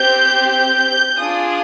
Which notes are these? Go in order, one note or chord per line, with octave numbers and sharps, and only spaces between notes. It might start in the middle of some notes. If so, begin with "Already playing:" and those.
Already playing: C4 G4 G6
G6
D4 F4 G#4 D#6